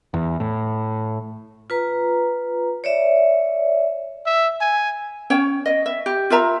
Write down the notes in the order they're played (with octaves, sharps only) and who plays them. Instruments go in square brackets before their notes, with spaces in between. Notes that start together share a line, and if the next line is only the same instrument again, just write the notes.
[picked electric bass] E2
A2
[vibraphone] F4 B4 A#5
C#5 D5 E5
[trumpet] E5
G#5
[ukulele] C#4 C#5 G5
D#5
E5
G4
F4 A#4 E5 A#5